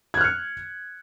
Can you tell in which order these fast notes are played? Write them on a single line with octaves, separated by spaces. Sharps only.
G#6 F#6 F6 C#7